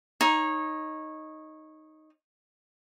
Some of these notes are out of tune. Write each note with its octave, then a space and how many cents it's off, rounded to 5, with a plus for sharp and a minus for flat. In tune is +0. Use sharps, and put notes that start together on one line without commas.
D#4 +0 C#5 -20